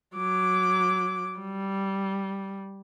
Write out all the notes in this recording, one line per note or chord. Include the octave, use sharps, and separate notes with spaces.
F#3 D6
G3